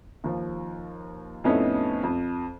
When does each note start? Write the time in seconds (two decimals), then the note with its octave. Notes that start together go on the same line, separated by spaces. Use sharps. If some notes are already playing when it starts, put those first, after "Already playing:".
0.24 D#2 F3
1.44 F2 A2 B3 C#4 D#4 E4
2.03 F2